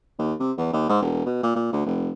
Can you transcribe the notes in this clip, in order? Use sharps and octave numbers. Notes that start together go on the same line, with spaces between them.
D#2
C3
E2
D#2
G#2
E1
B2
A#2
A#2
D2
F1